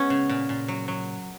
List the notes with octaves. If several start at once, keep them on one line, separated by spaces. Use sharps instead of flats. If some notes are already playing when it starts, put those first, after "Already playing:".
Already playing: G#3 B3 C#4
C#3
A#2
A#2
F#3
F#3